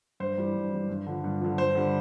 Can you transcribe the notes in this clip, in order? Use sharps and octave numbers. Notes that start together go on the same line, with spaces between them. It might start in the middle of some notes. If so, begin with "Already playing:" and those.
G2 C5
E3 G3
G2
E3 G3
G2
D3 F3
G2
D3 F3
G2 C5
D3 G3